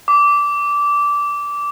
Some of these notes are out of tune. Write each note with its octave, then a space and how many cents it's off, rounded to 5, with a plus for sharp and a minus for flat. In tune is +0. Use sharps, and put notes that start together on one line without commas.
D6 -15